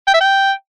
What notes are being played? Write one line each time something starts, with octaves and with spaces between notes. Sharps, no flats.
G5
E5
G5